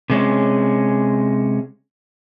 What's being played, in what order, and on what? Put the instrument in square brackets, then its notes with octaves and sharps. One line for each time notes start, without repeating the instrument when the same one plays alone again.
[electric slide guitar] C3 G#3 C#4